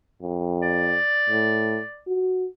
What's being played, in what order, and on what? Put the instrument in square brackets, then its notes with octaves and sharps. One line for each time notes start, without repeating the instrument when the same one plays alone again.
[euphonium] F2
[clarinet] D5
[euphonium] A2
F#4